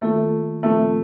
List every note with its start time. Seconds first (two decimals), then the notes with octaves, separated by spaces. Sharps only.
0.01 D#3 A3 A#3 F4 A4
0.63 A#2 F3 A3 C4 F4